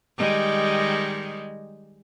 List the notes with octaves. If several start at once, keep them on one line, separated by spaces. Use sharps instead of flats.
D#3 G3 G#3